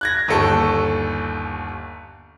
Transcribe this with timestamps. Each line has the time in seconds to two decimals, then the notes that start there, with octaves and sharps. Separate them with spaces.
0.01 F#6 G#6 A#6
0.28 G1 D#2 A4 C#6